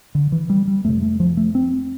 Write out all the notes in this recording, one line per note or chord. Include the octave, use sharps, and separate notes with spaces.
D3
E3
G3
G3
F2 C3 A3
A3
F3
A3
C4